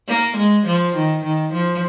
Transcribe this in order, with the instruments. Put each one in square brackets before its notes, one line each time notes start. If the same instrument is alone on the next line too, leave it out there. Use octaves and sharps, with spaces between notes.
[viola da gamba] A#3
G#3
F3
D#3
D#3
F3